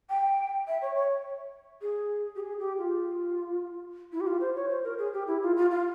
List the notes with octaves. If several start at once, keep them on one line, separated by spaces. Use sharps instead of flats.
G5
E5
C#5
C#5
G#4
G4
G#4
G4
F4
E4
G4
F4
C5
C#5
C5
A#4
G#4
G4
E4
F4
F4
F4